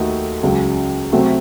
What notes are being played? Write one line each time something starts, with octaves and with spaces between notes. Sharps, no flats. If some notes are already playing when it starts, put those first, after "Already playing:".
Already playing: D#2 D#3 A3 D#4 F#4
C#2 C#3 F#3
C3 F#3 A3 C4 F#4